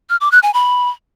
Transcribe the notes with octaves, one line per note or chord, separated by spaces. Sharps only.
F6
D6
F#6
G#5
B5